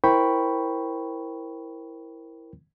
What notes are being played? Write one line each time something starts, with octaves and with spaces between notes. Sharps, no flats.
E4 A#4 C5 G5 B5 C#6